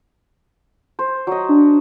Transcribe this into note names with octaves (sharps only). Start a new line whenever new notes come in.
C5
F#3 D#5
D4